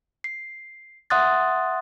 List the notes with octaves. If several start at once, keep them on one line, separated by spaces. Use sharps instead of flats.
C7
E5 F#5 C6 D#6 F#6 A6